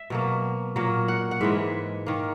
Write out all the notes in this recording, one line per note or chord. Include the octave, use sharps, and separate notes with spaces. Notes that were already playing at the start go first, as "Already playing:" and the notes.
Already playing: E5
B2 F#3 A#3
A#2 F#3 A#3
F#5
F#5
G#2 E3 G#3 E5
D#3 A#3